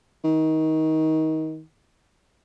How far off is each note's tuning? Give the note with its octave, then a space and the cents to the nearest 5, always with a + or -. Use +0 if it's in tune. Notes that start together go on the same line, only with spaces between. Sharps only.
D#3 +25